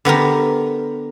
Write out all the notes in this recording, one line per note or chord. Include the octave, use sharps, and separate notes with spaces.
D3 B3 G4 A#4